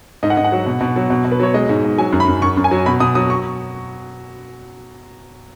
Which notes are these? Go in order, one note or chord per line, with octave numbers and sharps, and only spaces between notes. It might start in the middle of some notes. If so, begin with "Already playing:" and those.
G#2 D#5
F#5
G#2 D#5
F#5
F#3
B2
B2
F#3
B2
B2
B4
F#3 C#5
G#3 D#5
G#2
G#2
F#3 G#5
F#2
B5
F#2
F#2 C#6
F#2
G#5
F#3
B2 B5
B2 D#6
F#3 D#6
C#6